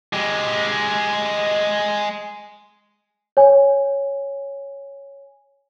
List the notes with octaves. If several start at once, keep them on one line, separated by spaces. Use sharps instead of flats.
G#3 G4
C#5 G#5